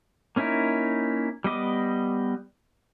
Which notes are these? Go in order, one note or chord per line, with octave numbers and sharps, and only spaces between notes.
A#3 C#4 D#4 E4 A#4
G3 B3 D#5 D6